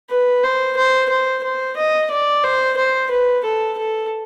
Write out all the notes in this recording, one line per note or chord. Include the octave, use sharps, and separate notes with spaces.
B4
C5
C5
C5
C5
D#5
D5
C5
C5
B4
A4
A4